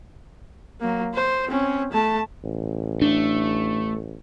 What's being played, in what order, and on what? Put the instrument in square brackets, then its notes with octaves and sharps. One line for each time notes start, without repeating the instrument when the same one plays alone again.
[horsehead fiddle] F#3 A#3
C5
C4 C#4
A3 A5
[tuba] A1
[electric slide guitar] A3 [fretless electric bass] D4